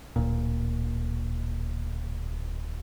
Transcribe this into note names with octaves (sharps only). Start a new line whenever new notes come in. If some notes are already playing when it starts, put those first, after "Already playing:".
D1 A#2